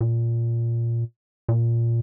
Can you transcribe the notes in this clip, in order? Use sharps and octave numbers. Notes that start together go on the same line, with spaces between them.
A#2
A#2